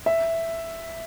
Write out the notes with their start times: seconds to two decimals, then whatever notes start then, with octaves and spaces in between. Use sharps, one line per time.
0.06 E5